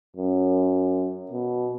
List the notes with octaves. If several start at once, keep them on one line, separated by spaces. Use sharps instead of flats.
F#2
B2